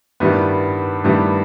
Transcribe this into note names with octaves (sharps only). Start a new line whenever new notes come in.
G2 D#3 G3 B3 E4
G2 D#3 G3 B3 E4